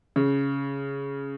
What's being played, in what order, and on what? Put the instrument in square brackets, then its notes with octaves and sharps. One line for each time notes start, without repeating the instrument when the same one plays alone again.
[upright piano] C#3